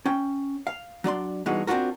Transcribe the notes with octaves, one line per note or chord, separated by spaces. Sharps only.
C#4 G5
F5
F#3 D4 D5 C6
G2 B2 E3 G#3 D#4 F#4
C4 D4 D#4 F4 F#4 A#4